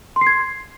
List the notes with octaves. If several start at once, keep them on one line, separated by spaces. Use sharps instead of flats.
C6
C7
G#6